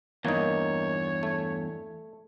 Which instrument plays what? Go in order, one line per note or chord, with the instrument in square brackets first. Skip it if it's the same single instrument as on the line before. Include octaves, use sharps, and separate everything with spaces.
[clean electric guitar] E2 G2 [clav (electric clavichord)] A#3 D#4 [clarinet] C#5
[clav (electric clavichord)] A3